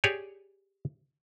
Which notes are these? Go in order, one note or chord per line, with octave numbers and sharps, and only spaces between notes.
G4 G#4 C#5 D5